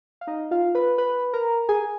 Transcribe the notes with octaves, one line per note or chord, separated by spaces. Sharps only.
F5
D#4 D#5
F4 F5
B4 B5
B4 B5
A#4 A#5
G#4 G#5